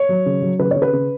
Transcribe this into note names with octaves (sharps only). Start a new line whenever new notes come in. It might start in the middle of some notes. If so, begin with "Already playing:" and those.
Already playing: C#5
F#3
C#3
F#3
C#3 B4
C#3 C#5
B4
C#3